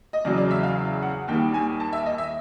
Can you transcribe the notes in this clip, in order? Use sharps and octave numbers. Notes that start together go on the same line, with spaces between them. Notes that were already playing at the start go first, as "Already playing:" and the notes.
D#5
E2 C#3 F#3 D5
D5
E5
F5
F#5
D#2 D#3 G3 G5
G#5
A5
E5
D#5
E5